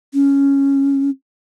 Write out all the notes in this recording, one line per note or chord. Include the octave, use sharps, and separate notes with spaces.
C#4